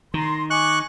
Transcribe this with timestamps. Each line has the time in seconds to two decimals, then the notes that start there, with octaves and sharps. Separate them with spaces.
0.14 D#3 A#5 C6
0.50 D#5 G#5 C#6 D6 F#6